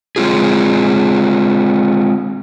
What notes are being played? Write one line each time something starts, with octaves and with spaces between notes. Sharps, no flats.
G#3 C4 F4 G#4